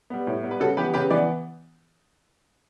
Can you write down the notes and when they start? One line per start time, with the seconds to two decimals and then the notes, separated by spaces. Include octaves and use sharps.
0.10 G3 B3
0.27 A2
0.43 G3 B3
0.51 B4
0.60 C#3 F#4 A4
0.77 E3 B3 G4 B4
0.94 C#3 G4 B4
1.10 E3 B4 D5
1.15 B3